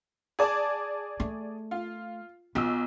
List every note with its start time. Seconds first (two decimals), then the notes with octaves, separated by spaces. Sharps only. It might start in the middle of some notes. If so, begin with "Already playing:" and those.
0.39 G#4 D5 A5
1.20 A3
1.71 F4
2.55 B1 B3 F4 E6